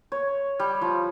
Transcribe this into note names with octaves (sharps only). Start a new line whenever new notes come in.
C#5
G3
F3